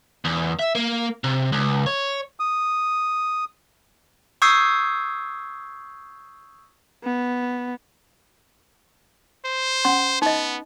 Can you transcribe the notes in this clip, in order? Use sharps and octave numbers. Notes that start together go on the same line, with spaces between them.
E2
E5
A#3
C3
C#2
C#5
D#6
C#6 D#6 E6 G6 G#6 C7
B3
C5
C#4 F#5 C6
B3 D#4 D#5